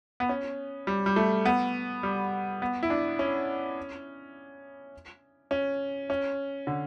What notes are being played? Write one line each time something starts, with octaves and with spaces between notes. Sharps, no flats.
B3
C#4
G3
G3
A3
B3
G3
B3
E4
D4
C#4
C#4
C#4
D3